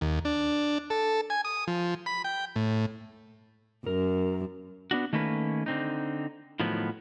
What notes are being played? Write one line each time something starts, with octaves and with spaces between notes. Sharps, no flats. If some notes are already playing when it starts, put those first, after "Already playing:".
D#2
D4
A4
G#5
D#6
F3
B5
G5
A2
F#2 A#4
B3 D4 F#4
D#3 A3 A#3 C#4 B4
D3 C4 D#4
A2 D#3 F3 F#3 B3